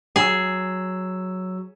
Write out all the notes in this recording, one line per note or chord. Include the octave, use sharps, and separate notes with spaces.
F#3 G#4 E6